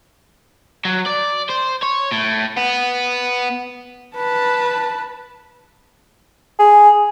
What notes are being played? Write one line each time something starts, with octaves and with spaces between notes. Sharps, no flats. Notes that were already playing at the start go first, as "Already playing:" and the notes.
F#3
D5
C5
C#5
A2
B3
B4 A5
G#4